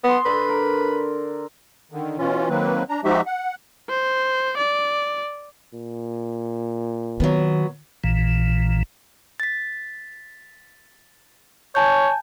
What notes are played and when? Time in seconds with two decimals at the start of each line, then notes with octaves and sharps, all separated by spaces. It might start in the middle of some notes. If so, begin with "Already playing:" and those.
0.04 B3 D#5 C6
0.26 D3 B4
0.49 A#4
1.92 D3 D#3
2.18 B2 E3 C#4 F4
2.49 D#3 F#3 A#3 C4 B4
2.89 D4 A#5
3.04 F3 G#3 D#4 F#4 G4 E5
3.26 F#5
3.89 C5
4.57 D5
5.74 A#2
7.20 D#3 F#3 B3
8.04 A#1 A#2 E3
9.40 A6 B6
11.75 C#5 G#5 A5 G6